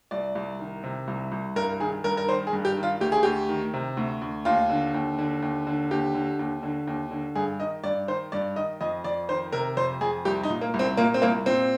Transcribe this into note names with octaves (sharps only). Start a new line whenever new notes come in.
C2 D5
C2
D#3
C3
C2
C2
G2 A#4
D#3 G#4
G2 A#4
A#4
D#3 C5
G#4
G2
G4
D#3
F4
D2 G4
G#4
D2 G4
D#3
C3
D2
D2
D#2 F4
D3
D#2
D3
D#2
D3
D#2 G4
D3
D#2
D3
D#2
D3
G2 G#4
D#3 D#5
G2 D5
D#3 C5
G2 D5
D#3 D#5
F2 D#5
F2 D5
D#3 C5
C3 A#4
F2 C5
F2 G#4
C2 G4
D#4
A#2
A#3
C2
C4
A#2 A#3
C4
C2 A#3
A#2 C4